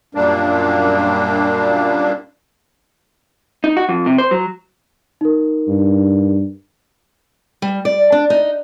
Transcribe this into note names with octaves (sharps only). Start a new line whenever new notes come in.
F#2 A#2 G3 A#3 D4
D#4
F#4
F2
C3
C5
F#3
D#4 A#4
G2
G3
D5
D4
D#4